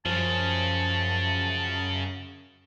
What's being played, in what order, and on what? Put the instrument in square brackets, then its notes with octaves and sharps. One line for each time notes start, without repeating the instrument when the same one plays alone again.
[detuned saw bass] F#2 [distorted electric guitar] C#3 [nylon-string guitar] F3 [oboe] A5